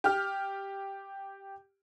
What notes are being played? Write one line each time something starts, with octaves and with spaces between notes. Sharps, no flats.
G4 F6